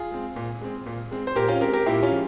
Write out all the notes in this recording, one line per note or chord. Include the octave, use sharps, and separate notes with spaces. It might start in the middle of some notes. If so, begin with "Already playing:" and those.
Already playing: F4 G#4
G#3 C4
A#2
G#3 C4
A#2
G#3 C4
C5
A#2 G4 A#4
C#4 F4
G#3 C4 G4 A#4
G4 A#4
A#2 E4 G4
C#4 F4
F3 G#3